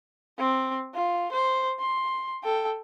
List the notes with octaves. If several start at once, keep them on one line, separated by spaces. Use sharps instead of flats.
C4
F4
C5
C6
A4 G5